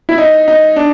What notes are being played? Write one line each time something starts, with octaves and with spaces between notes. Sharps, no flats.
E4
D#4
D#4
D4